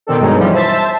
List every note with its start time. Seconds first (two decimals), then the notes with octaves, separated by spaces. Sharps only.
0.07 B2 D#3 C4 D4 A4
0.20 G2 B2 F#3 G#3 D#4
0.36 E3 F3 G3 C#4
0.54 C5 E5 A5